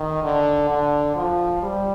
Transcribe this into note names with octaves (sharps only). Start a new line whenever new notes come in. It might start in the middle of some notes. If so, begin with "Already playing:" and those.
Already playing: D#3
D3
D3
F3
G3